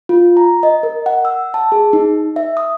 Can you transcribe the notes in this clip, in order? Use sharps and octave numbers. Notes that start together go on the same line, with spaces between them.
F4
A#5
D#5
A#4
F#5
E6
A5
G#4
D#4
E5
D#6